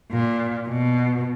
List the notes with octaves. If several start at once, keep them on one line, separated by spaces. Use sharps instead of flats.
A#2
B2